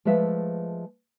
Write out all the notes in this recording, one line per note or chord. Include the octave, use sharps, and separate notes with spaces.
F3 G#3 A3 B4 E5 F5